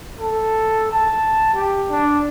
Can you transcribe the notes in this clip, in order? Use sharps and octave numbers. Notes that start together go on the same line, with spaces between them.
A4
A5
G4
D4